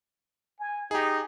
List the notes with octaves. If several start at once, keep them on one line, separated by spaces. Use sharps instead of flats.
G#5
D#4 G4 G#4